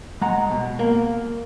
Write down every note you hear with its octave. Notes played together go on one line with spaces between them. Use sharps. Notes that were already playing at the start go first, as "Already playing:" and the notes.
G#3 F#5 A#5
B2
A#3